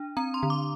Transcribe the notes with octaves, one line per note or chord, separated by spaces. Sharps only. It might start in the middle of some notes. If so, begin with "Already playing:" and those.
Already playing: D4
C4 A#5
C6
D3
D6